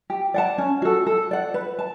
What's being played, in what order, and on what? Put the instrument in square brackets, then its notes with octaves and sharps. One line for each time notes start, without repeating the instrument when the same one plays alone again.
[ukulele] G4
D5 F#5 A5
C#4
F#4 A4
A4
D5 F#5
B4
A5